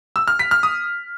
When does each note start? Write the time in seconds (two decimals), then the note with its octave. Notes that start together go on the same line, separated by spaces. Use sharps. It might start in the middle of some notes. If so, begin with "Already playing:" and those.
0.16 E6
0.28 F6
0.39 B6
0.51 F6
0.63 D#6